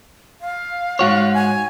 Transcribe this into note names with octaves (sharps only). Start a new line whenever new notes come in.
F5
G#2 F#4 C#5
G#5